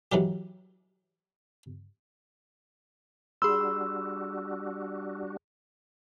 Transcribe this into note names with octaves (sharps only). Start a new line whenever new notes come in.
G#2 E3 F#3 G4
G3 D4 F#4 G#4 B5 C6 E6